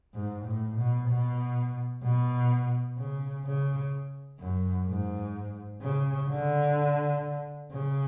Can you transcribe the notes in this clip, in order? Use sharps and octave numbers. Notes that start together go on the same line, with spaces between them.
G#2
A2
B2
B2
B2
C#3
C#3
F#2
G#2
C#3
D3
C#3